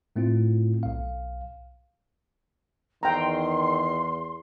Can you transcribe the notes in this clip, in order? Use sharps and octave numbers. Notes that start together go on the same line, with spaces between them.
A2 A3 C4 E4 F4
B1 F5
E2 D#3 G5 A#5 C6